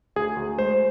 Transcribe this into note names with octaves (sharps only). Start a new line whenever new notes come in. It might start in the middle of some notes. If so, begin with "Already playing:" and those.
D2 G#4
D2
G#3 C5